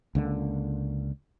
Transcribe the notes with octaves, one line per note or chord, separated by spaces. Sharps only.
C#2 D3 G#3 A#3